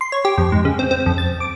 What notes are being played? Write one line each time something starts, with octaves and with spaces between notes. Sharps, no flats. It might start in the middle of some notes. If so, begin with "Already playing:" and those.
C6
C#5
G4
F2
G#2
C#3
C4
C4
F2
A6
D6